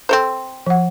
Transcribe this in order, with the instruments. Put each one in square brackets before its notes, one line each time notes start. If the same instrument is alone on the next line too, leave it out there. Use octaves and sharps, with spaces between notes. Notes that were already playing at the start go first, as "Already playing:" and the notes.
[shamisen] C4 A4 C5
[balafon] F3 F#5